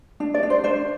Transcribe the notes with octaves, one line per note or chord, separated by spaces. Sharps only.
D4
D5
D4
C5
D4 C5